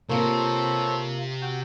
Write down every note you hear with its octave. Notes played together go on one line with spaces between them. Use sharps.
C3 A#3 F4 A4 C5 C#5
F#4 G5